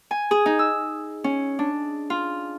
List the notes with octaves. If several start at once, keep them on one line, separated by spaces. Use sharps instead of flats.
G#5
G#4
D#4
E6
C#4
D4
F4